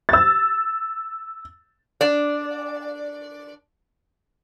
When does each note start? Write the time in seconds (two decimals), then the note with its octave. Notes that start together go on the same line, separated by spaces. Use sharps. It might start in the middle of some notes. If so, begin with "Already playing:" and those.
0.09 E6 A6
2.01 D4 D5